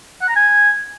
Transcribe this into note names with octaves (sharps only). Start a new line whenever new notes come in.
F#5
A#5
G#5